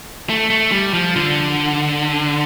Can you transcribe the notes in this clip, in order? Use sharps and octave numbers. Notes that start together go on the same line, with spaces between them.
A3
A3
G3
F3
D3